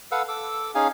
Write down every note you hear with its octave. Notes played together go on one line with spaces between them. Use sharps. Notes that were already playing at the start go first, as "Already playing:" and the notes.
A4 B4 F5 F#5 E6
A4 D6 E6
C#4 D#4 G#4 F5 G#5